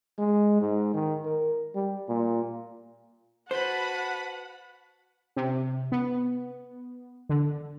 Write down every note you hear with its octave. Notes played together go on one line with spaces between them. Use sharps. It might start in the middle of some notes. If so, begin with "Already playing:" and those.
G#3
G#2
D#3
A#4
G3
A#2
F#4 B4 C5 F#5 A5 B5
C3
B3
D3